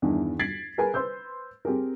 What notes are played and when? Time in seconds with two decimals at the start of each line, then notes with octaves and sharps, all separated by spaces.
0.02 E2 G2 D#3 E3 D4
0.39 G#6 A6 B6 C7 D7 F#7
0.78 G#4 A#4 B4 G#5
0.94 B4 C5 C6 E6 G6
1.65 C4 G4 G#4 A#4